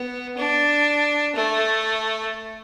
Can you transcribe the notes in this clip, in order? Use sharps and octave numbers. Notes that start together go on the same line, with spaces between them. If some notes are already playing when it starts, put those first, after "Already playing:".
Already playing: B3
D4
A3